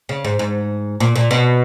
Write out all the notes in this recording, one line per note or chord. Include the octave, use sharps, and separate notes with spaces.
C#3
G#2
G#2
A#2
A#2
B2